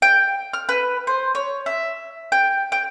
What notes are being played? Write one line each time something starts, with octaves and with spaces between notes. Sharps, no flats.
G5
F6
B4
C5
C#5
E5
G5
G5